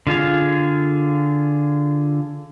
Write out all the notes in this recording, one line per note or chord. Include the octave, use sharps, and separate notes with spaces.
D3 F4 G#4 F5